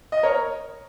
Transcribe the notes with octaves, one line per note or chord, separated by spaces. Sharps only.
D#5
A#4 C#5